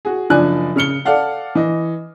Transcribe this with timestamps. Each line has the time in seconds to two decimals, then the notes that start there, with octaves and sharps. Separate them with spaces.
0.05 F#4 G#4
0.30 F#1 F3 D4 D5 G#5 F#6
0.76 C#3 F6 C#7 G7
1.05 A4 D5 F5 F#5
1.55 E3 D#5